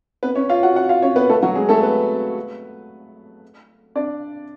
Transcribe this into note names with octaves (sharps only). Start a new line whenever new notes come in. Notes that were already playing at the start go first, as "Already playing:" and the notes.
B3 B4
C#4 C#5
F4 F5
F#4 F#5
F#4 F#5
F4 F5
C#4 C#5
B3 B4
A3 A4
F#3 F#4
G#3 G#4
A3 A4
B3 B4
D4 D5